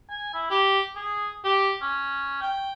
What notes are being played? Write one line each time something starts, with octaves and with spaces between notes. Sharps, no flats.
G#5
E4
G4
G#4
G4
C#4
G5